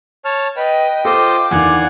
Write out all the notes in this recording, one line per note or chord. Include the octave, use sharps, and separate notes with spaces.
C#5 A5 F6
B4 D#5 G5
F4 A4 C5 D#5 D6
E2 D3 D#3 D5 F5 F#5 G#5